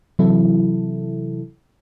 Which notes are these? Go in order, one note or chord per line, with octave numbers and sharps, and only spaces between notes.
C3 E3 F#3 E4 A4